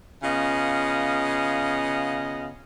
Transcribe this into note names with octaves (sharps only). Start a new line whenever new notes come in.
C#3 B3 F4 D#5